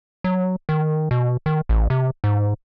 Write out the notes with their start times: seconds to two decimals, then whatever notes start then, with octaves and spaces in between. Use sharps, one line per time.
0.24 F#3
0.69 D#3
1.11 B2
1.46 D#3
1.69 A1
1.90 C3
2.24 G#2